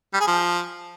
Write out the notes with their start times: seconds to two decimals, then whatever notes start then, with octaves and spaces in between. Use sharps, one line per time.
0.13 G3
0.20 G#4
0.27 F3